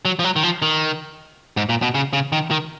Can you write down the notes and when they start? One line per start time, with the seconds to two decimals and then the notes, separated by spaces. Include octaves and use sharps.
0.05 F#3
0.19 F3
0.24 F#3
0.36 D#3
0.43 F3
0.62 D#3
1.57 G#2
1.69 A#2
1.82 B2
1.95 C#3
2.13 C#3
2.32 D#3
2.51 D#3